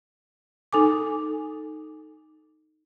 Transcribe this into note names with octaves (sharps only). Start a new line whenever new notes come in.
D#4 A4 G#5 D6